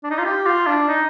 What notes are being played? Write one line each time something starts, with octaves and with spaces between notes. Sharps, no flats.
D4
D#4
F4
G4
F4
D4
D#4